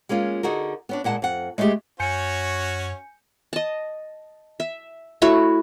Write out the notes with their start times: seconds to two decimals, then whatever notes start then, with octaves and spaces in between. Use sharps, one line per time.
0.09 G#3 A#3 C#4 F4
0.43 D3 D#4 F#4 G#4 A#4
0.89 B3 C#4 D4
1.04 A#2 G#3 F#5 A5
1.22 F2 F#5
1.58 G#3 A3 B3 C#4 G4 G#4
2.00 F#2 C#4 F#4 C#5 G#5 G6 C#7
3.53 D#5 A5
4.60 E5
5.22 A3 E4 F#4 C#5